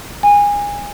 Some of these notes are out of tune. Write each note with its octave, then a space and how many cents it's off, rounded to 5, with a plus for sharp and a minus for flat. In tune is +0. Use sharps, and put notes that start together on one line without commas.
G#5 -25